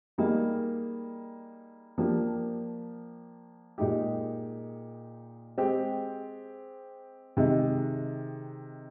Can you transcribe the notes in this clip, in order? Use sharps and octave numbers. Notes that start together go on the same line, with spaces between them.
G3 A#3 D#4 G#4
F3 A#3 D4 G4
A#2 G#3 D#4 G4
G#3 C4 G4
C3 D#3 G#3 D#4